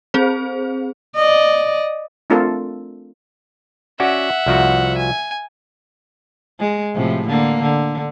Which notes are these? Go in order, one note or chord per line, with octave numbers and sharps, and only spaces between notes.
C4 G#4 C5
D5 D#5
A3 C4 D4 F4 A4 A#4
C#4 F#4 D5 E5 F#5
C2 F3 F#4
G#5
G#3
A2 C3 F3
D3 A#3
D3